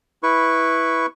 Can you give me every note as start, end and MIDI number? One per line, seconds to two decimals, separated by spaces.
0.23 1.06 64
0.23 1.06 71
0.23 1.06 85